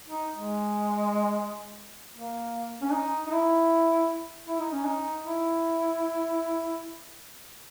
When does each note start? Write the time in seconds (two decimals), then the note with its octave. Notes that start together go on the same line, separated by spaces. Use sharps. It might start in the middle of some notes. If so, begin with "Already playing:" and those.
0.09 D#4
0.35 G#3
2.16 A#3
2.82 C#4
2.92 D#4
3.26 D#4
3.31 E4
4.47 E4
4.60 D#4
4.72 C#4
4.85 D#4
5.25 E4